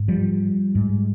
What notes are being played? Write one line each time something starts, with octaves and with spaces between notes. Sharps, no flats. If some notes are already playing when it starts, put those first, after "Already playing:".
Already playing: G#2
F3 G3
G#2